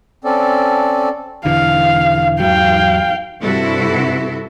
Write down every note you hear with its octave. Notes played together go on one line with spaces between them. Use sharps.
C4 C#4 A4 D5
E1 D3 E3 F5
E2 G#2 F#3 F5 G5
G2 C3 E4 F#4 A4